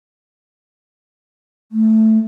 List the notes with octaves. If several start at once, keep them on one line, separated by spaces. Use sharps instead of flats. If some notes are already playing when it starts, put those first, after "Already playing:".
A3